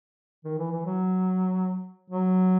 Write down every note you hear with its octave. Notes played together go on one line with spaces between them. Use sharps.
D#3
E3
E3
F#3
F#3